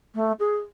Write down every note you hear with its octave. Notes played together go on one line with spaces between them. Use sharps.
A3
G#4